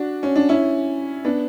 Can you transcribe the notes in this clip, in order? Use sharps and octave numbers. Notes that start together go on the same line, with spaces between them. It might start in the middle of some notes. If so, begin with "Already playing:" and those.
Already playing: D4 F#4
C#4
D4
C#4 E4
B3 D4